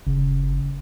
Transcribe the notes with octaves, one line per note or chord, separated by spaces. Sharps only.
F#1 C#3